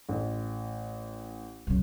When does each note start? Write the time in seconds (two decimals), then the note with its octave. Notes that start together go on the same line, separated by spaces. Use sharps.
0.09 A1
1.67 F#2 C#3